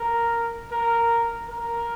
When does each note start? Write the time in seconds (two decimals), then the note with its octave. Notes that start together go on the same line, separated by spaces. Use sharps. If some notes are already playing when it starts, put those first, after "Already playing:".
Already playing: A#4
0.71 A#4
1.49 A#4